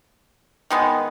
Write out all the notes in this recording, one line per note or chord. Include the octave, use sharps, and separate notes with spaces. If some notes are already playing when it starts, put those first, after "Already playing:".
D#3 G#3 B3